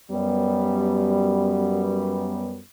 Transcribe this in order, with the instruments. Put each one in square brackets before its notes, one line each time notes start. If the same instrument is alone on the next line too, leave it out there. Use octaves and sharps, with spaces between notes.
[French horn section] F#2 G3 B3